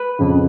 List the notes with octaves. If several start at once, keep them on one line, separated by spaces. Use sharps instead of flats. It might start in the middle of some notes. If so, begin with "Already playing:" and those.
Already playing: B4
F2 C#3